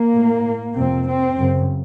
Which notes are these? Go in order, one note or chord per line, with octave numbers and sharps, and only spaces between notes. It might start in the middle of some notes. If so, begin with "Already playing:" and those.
Already playing: A#3
A2
F2 C3 C4
C4
F#2 C#3